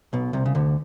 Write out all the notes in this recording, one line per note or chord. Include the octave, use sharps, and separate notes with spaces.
B1 B2
C2 C3
C#3
D2 D3